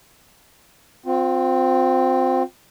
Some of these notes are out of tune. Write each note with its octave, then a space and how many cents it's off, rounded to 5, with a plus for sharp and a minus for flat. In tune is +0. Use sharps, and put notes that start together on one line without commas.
C4 -5 F4 +35